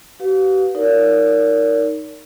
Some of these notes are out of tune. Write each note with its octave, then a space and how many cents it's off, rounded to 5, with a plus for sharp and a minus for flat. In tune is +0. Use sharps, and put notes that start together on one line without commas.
G4 -45 B4 +0 F5 +35
D#4 +0 A#4 -15 D5 -40